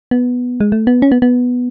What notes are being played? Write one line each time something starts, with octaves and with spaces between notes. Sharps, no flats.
B3
G#3
A3
B3
C#4
B3
B3